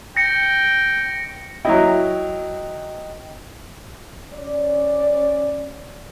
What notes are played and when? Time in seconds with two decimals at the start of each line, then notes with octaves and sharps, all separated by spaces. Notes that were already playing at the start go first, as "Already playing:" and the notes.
0.17 G5 A#6 C#7
1.65 F#3 E4 D#5 G5
4.34 C#4 D5